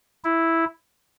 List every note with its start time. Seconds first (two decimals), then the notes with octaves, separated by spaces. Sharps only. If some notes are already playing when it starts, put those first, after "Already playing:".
0.24 E4